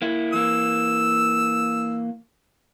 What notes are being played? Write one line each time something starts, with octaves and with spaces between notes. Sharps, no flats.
A#3 E4
E3 A#3 E6